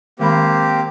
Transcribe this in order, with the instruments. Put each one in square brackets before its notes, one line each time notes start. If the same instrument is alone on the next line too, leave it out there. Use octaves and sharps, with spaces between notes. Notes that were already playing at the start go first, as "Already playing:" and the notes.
[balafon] D#3 G#3 B5 [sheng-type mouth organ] A#3 C4 G4